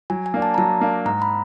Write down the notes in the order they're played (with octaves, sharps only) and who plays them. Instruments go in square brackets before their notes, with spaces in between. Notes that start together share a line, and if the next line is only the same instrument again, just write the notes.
[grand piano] F#3 [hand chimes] G#5
[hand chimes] G#5
[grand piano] A#3 D4
[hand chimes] A5
A#5
[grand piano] F#3 [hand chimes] A5
[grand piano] A#3 D4
[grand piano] G#2 [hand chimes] A#5
[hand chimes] B5